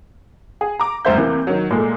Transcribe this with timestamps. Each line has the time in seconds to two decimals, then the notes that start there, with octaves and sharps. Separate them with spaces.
0.61 G#4
0.80 A#5 D6
1.05 F1 G2 C5 E5 G6
1.18 C3 E3 A#3
1.47 D#3 F#3
1.71 A#2 G#3 A3